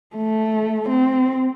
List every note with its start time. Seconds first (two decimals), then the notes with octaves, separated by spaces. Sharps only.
0.16 A3
0.89 C4